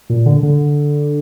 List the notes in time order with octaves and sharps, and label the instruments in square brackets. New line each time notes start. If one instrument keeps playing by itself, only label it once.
[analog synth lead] A#2
D3
D3